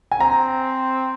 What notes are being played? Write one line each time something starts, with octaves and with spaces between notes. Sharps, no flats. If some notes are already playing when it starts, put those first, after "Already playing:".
G#5
C4 A#5